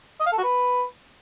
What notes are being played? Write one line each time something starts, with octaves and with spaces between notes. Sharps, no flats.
D#5
F5
A4
F#4
B4